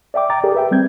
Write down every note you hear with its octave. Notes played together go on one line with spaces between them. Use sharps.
D5 E5 G5 D6
G5 A#5 D6 A6
G4 G#4 A#4 D5
B4 E5 G5
G3 C4 G6 G#6